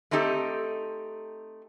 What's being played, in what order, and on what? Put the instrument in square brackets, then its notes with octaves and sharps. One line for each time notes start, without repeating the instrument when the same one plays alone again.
[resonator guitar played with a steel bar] A3 C4 D#4 G4 A4